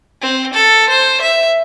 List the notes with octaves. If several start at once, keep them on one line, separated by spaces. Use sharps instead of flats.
C4
A4
C5
E5